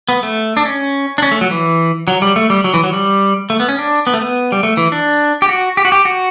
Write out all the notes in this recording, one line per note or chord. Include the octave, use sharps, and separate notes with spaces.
B3
A3
D4
C#4
D4
C#4
A3
F#3
E3
F#3
G3
A3
G3
F#3
E3
F#3
G3
A3
B3
C#4
D4
B3
A3
B3
G3
A3
E3
D4
G4
F#4
G4
F#4
G4
F#4